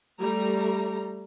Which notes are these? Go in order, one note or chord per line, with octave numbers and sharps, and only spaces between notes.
G3 A3 A#5